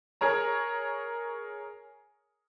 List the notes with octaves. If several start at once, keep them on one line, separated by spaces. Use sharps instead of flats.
G#4 A#4 C#5 A#5